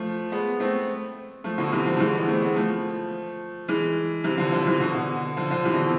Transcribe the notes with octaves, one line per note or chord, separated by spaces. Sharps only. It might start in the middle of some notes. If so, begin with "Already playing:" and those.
Already playing: F3 A3
G#3 B3
A3 C4
F3 A3
B2 D3
C3 E3
D3 F3
A3
E3 G#3
G#3 B3
A3 C4
G#3 B3
F3 A3
E3 G#3
C3 E3
D3 F3
D3 F3
C3 E3
B2 D3
B2 D3
D3 F3
D3 F3
C3 E3
B2 D3
C3